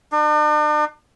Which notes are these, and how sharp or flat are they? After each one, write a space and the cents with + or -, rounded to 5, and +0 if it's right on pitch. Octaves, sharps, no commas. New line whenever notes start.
D4 +45